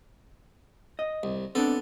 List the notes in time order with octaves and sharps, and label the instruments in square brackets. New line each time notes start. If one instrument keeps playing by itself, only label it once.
[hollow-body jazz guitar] D#5
[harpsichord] C2
[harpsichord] B3 A4 [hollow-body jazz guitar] C4 D4